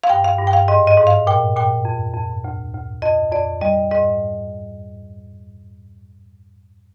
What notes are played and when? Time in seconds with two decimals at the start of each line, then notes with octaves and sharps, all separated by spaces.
0.04 F5
0.09 G2 G5
0.24 F5
0.39 G2
0.47 G5
0.53 F5
0.68 G#2 D#5
0.87 D#5
0.97 G#2
1.07 F5
1.27 A#2 G5
1.56 A#2 G5
1.85 F2
2.14 F2
2.44 D2
2.74 D2
3.02 F2 D#5
3.32 F2 D5
3.61 G3 D#5
3.91 G#2 D#5